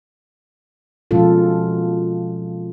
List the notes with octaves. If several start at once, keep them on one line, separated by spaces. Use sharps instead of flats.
B2 F3 G#3 C#4 F4 A4